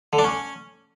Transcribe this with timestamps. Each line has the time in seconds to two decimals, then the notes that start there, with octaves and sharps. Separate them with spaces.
0.13 D3
0.18 D4
0.24 C#4